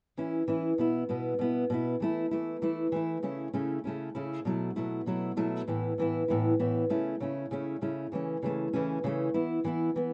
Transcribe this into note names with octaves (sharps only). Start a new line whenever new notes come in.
E3 C#4 E4
E3 C#4 E4
B2 B3 E4
B2 B3 E4
B2 B3 E4
B2 B3 E4
E3 A3 E4
E3 A3 E4
E3 A3 E4
E3 A3 E4
C#3 A3 C#4 E4
C#3 A3 C#4 E4
C#3 A3 C#4 E4
C#3 A3 C#4 E4
B2 F#3 A3 E4
B2 F#3 A3 E4
B2 F#3 A3 E4
B2 F#3 A3 E4
A2 E3 B3 E4
A2 E3 B3 E4
A2 E3 B3 E4
A2 E3 B3 E4
C#3 A3 C#4 E4
C#3 A3 C#4 E4
C#3 A3 C#4 E4
C#3 A3 C#4 E4
C#3 E3 A3 C#4
C#3 E3 A3 C#4
C#3 E3 A3 C#4
C#3 E3 A3 C#4
E3 B3 E4
E3 B3 E4
E3 B3